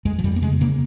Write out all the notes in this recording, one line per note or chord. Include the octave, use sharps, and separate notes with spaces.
F2 G#3
F3
F2 G3
A#3
C#3 G#3
C#3 A#3